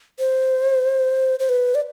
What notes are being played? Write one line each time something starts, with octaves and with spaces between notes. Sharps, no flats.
C5
C5
B4
D5